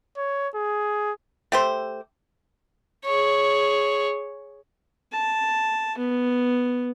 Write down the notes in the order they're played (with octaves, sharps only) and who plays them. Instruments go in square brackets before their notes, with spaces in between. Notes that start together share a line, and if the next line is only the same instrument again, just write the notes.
[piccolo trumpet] C#5
G#4
[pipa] A3 G4 C5
[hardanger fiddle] G#4 C#5
[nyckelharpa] A5
B3